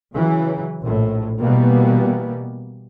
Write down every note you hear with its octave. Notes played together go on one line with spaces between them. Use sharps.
C#3 E3 F#3
A#1 A2
B2 E3 G3 A#3 B3